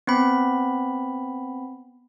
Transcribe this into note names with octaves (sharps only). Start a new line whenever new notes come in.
B3 C4 B5